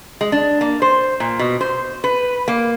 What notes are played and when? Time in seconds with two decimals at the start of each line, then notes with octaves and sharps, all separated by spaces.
0.21 G#3
0.32 D4
0.61 A#3
0.82 C5
1.20 A#2
1.39 B2
1.61 C5
2.04 B4
2.48 A#3